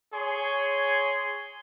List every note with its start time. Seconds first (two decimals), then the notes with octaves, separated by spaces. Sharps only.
0.14 G#4 C#5 G#5 C6